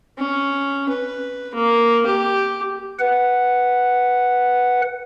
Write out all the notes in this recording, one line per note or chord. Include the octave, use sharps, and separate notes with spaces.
C#4
B4
A#3
G4
B4 F#5